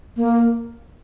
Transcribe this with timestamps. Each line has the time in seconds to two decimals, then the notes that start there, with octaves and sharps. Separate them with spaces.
0.17 A#3